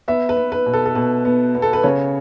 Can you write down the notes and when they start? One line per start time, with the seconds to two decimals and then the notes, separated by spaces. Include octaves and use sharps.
0.08 B3 E5
0.29 B4
0.37 B3
0.52 B4
0.66 B2
0.73 A4
0.86 A4
0.95 B2 B4
1.25 B3
1.55 B3
1.62 A4
1.73 B4
1.83 C#3 C#5